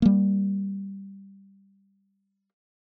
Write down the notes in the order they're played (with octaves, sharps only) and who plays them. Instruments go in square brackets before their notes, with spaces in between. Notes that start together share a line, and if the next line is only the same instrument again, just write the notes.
[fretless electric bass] G3 A#3